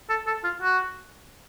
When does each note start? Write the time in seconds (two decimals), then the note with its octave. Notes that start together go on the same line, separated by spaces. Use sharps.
0.09 A4
0.27 A4
0.44 F4
0.62 F#4